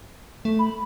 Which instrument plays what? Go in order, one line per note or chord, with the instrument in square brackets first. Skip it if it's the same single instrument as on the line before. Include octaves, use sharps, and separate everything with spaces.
[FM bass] A3
[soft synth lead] B5